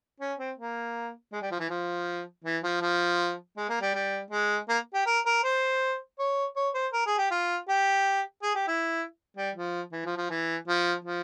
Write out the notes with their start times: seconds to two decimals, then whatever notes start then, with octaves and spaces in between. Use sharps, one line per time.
0.20 C#4
0.38 C4
0.58 A#3
1.32 G#3
1.42 G3
1.51 F3
1.60 E3
1.70 F3
2.45 E3
2.63 F3
2.81 F3
3.57 G#3
3.69 A#3
3.81 G3
3.94 G3
4.31 G#3
4.69 A#3
4.94 G4
5.06 A#4
5.26 A#4
5.43 C5
6.19 C#5
6.56 C#5
6.74 C5
6.93 A#4
7.06 G#4
7.18 G4
7.31 F4
7.69 G4
8.43 G#4
8.55 G4
8.68 E4
9.37 G3
9.55 F3
9.92 E3
10.05 F3
10.17 F3
10.30 E3
10.68 F3
11.05 F3